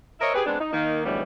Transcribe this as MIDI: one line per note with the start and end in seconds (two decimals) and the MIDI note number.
0.20 0.33 70
0.20 0.33 72
0.20 0.33 73
0.20 0.33 75
0.20 0.33 76
0.34 0.43 67
0.34 0.43 68
0.34 0.43 71
0.46 0.57 56
0.46 0.57 59
0.46 0.57 60
0.46 0.57 62
0.60 0.72 63
0.73 1.01 51
0.73 1.01 58
0.73 1.01 63
1.05 1.22 38
1.05 1.22 44
1.05 1.22 52
1.05 1.22 55
1.05 1.22 59
1.05 1.22 73